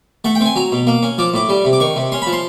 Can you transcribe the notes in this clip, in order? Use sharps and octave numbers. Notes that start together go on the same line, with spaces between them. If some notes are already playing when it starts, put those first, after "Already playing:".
A3 F#5
G5
C4 G#5
F#3 A#5
B2
A#3
C#4
F3 D6
A2 D6
G3
C3
D6
D#3 C#6
C3
C#4 C6
F3 B5
C6